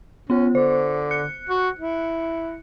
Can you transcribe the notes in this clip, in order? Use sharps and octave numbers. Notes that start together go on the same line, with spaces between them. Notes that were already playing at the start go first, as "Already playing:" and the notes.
B3 C#4 F4
D3 C5
F#6 C#7
F#4
E4